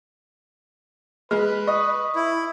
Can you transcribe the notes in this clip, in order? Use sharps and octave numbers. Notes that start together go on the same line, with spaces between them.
G#3 B4 F6
D#5 C#6 D#6
E4